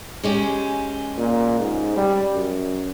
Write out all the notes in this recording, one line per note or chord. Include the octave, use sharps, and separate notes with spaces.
G#3 C#4 G4
A#2
G#2
G3
F#2